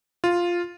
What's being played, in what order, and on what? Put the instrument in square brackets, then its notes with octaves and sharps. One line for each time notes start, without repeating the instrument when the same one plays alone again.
[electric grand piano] F4